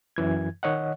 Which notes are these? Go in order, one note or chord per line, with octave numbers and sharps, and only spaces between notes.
F#2 E3 G#6
D#3 C#5 D#5 F#5